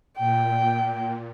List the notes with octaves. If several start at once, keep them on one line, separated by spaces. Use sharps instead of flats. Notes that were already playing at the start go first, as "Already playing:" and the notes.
A#2 G5